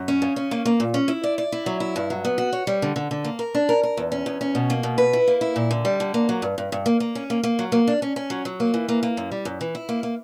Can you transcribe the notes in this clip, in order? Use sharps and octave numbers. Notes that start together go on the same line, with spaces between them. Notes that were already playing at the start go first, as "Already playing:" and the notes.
Already playing: F#2
C#4
C#3
C#4
A#3
A#3
A#2
C#4
E4
D5
D5
E4
F#3
E4
G2
F#3
B3
F#4
C#5
G3
D3
D3
D3
A#3
A#4
D4
A#4
A#4
E2
C#4
E2
C#4
B2
A#3
B2
B4
E4
A#3
E4
A#2
D3
G3
D3
A#3
F#3
G2
G2
G2
A#3
A#3
C#4
A#3
A#3
F#3
A#3
D4
C#4
C#4
F#3
F#3
A#3
E3
A#3
A#3
F#2
G3
F#2
E3
E4
A#3
A#3